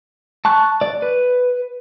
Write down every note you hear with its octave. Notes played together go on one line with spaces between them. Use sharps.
A5 C#6 F#6
D5
B4